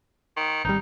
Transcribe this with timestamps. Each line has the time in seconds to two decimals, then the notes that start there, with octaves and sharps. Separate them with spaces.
0.37 D#3
0.65 G#1 G3 D#4